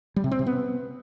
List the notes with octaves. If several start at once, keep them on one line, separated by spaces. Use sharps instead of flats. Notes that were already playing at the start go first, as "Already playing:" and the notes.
G3
C3
C4
C3
B3